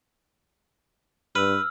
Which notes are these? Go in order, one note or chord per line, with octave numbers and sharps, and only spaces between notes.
G2 B4 E6 F6